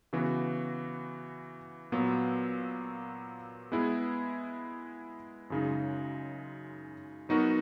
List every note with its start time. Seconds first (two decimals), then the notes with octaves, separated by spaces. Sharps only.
0.13 C#3 E3 B3 F#4
1.92 A#2 F#3 B3
3.72 G#3 B3 E4 G#4
5.50 F#2 C#3 G#3 D#4
7.29 F#3 B3 D#4 F#4 A#4